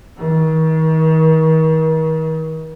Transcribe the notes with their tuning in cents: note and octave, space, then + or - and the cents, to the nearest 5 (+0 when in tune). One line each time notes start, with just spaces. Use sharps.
D#3 +40